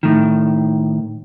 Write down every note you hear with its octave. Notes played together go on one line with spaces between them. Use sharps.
A2 D#3